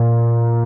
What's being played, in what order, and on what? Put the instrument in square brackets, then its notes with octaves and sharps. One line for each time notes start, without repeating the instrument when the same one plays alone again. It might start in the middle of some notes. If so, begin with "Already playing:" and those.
Already playing: [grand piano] A#2